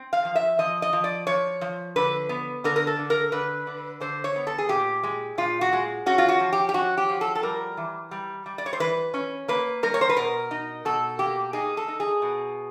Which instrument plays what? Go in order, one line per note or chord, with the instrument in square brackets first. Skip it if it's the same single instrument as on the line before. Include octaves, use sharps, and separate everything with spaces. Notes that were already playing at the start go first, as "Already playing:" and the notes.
Already playing: [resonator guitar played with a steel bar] C4
F5
F3
E5
F3 D#5
D#5
F3
D5
F3 C#5
F3
D3 B4
B3
D3 A#4
A#4
A4
D3
A#4
D3 B4
D3
D3 C5
C#5
B3
A4
G#4
A#2 G4
G#3
A#2 F4
F#4
G#3
C#4 F#4
F4
F#4
F3
G4
G4
C#4 F#4
G4
F3
A4
A4
G3 A#4
E3
G3
G3
D5
C#5
C5
E3 B4
C#4
A#3 B4
G3 A#4
C#5
C5
B4
B2 A#4
D#4
B2 A4
A#3 G4
D#4 G#4
A4
D#4
G#4
B2